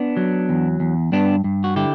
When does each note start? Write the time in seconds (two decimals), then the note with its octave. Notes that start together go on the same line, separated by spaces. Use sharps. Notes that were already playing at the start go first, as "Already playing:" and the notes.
Already playing: B3 D4
0.17 F#3
0.49 E2
0.80 E2
1.12 G2 B3 D4
1.44 G2
1.64 F#4
1.76 D3 E4 G4